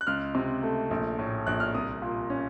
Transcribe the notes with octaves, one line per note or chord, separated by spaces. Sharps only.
F#6
C#2 F6
C3
A3
A#1
A2
A#1 F#6
F6
C2 D#6
A#2
C#4